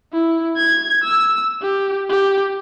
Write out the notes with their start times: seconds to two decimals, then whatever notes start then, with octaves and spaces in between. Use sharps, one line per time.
0.13 E4
0.57 G#6
1.04 E6
1.62 G4
2.10 G4